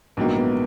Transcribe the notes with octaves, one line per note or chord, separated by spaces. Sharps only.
A#1 G#2 D#3 F#3 A#3 B3
B3